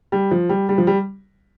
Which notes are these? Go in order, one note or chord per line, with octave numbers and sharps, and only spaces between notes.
G3
F3
G3
G3
F3
G3